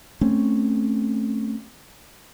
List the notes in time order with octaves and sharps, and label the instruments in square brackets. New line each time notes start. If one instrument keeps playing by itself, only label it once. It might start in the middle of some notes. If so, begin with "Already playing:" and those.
[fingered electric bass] A3 C4 C#4